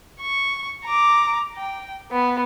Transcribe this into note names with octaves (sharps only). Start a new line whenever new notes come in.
C#6
A#5 D6
G5
B3